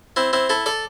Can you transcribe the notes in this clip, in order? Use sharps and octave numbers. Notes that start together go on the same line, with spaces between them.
C4 E4
C4 E4
E4 A4
A4 D5